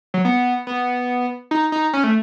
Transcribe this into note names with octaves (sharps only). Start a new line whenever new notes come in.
F#3
B3
B3
D#4
D#4
C#4
A3